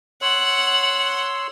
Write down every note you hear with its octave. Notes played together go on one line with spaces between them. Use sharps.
C#5 F#5 C6 E6 F#7